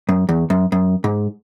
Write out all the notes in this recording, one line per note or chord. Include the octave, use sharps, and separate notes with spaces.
F#2
E2
F#2
F#2
G#2